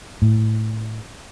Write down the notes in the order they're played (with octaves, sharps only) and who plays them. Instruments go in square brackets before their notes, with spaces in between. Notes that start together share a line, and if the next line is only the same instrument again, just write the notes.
[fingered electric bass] A2